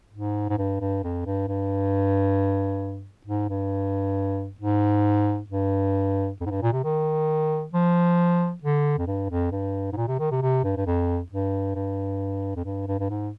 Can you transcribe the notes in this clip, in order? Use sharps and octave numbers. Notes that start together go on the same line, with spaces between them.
G#2
G#2
G2
G2
F2
G2
G2
G#2
G2
G#2
G2
F2
G#2
G2
A#2
C3
D#3
F3
D3
F2
G2
F2
G2
G#2
A#2
C3
D#3
C3
C3
G2
G2
F2
G2
G2
F2
G2
G2
G2
G#2